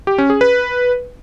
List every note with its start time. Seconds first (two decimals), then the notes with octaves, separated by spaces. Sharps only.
0.07 G4
0.18 C#4
0.30 G#4
0.41 B4